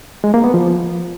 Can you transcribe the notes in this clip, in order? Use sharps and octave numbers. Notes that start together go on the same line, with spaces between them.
G#3
A#3
B3
F3